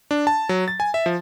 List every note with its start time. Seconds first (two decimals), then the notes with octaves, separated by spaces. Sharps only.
0.11 D4
0.27 A5
0.49 F#3
0.68 A6
0.80 G#5
0.94 E5
1.06 F3